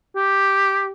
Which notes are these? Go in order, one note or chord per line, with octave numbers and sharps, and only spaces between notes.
G4